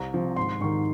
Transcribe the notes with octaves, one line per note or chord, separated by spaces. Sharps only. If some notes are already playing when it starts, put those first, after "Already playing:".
Already playing: C2 A#5
C3 F3
G#1 C6
G#2 D#3 C#6